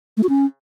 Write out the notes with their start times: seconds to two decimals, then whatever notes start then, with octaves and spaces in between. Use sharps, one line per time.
0.17 A3
0.23 F#4
0.29 C#4